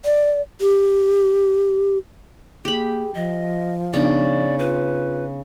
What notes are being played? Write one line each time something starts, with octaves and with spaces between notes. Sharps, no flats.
D5
G4
A#3 G4 G#4 B5
F3 D#5
C#3 B3 D4 D#4 D5
F4 B4